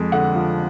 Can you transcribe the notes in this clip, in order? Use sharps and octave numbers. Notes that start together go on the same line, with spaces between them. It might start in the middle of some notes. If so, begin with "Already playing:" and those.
Already playing: F2 G#3
D3 F#5
F3